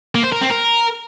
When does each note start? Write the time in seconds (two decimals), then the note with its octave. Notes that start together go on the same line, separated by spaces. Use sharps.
0.15 A#3
0.24 C5
0.32 A#4
0.41 C4
0.50 A#4